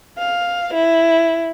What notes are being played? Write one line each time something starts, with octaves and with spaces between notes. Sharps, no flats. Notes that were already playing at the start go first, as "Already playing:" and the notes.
F5
E4